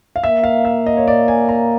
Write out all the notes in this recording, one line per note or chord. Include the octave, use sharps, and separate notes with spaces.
F5
A#3 E5
F5
E5
D#5
C#5
D5
G#5
A#5